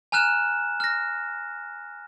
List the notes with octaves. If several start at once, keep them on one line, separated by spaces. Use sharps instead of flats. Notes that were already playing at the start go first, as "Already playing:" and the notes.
G#5 A#5 F6 F#6 E7
F6 A#6